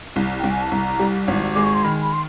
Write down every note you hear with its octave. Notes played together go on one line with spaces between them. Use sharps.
C2
C2 G5
G#5
A5
C2 A#5
G3
G#1
G#3 D6
C#6
C6
D#3 B5
B5
C6